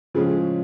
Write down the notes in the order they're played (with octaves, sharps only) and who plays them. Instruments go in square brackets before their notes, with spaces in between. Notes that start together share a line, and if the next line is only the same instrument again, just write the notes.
[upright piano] A2 G#3 C#4 G#4 [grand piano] C#3 F3